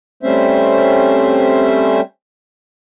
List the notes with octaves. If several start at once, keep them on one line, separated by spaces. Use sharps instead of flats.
G3 A3 C4 C#4 C5 E5